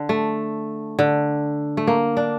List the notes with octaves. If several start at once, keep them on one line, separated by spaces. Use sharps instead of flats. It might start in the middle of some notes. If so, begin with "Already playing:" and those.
Already playing: D3
A3
D3
A3
A#3
D4